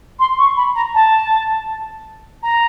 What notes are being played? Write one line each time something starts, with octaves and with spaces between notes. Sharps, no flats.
C6
C#6
B5
A#5
A5
A#5